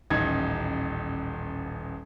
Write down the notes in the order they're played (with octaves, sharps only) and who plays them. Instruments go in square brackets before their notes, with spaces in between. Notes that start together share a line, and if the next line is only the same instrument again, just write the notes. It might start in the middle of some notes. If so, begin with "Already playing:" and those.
[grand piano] D#1 A1 D#4 G#6